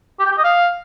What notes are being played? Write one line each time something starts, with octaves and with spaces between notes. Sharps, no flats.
G4
G5
G4
D#5
F5